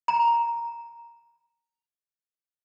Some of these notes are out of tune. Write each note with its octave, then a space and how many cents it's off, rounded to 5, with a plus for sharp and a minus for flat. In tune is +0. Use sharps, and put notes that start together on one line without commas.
A#5 +5